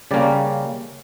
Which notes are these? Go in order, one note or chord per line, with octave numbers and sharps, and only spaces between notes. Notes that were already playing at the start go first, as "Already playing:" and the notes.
C#3 G3 A#3 C#4 D5